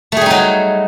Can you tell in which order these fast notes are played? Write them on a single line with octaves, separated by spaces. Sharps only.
A3 G#4 G3 D#4 F#3